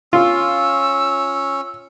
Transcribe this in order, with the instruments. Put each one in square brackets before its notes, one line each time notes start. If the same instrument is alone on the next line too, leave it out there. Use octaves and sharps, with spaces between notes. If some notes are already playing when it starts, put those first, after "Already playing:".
[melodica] C#4 [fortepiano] F4 [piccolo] E6